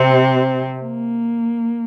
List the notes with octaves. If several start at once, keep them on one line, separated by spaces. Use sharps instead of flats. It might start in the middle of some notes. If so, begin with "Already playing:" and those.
Already playing: C3 C4
A#3